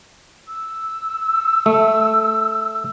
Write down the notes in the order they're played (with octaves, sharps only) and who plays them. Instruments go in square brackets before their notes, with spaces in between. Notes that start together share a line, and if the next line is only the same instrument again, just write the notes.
[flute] E6
[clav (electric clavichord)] A3